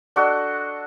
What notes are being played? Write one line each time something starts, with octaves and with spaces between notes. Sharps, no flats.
D4 F#4 A4 D#5